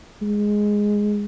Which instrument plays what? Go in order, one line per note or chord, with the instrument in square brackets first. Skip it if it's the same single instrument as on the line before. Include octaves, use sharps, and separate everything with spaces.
[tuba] G#3